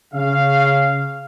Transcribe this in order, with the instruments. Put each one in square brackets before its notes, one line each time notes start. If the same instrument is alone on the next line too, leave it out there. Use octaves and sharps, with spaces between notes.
[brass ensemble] C#3 F5